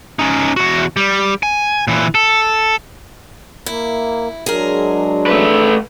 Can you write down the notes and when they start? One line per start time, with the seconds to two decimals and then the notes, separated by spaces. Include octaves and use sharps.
0.19 C#4 D#4
0.56 E2 F#4
0.97 G3
1.43 G#5
1.88 A#2 E3
2.15 A4
3.66 A#3 E4
4.46 F#3 G#3 D4 G#4 A#4
5.26 A3 B4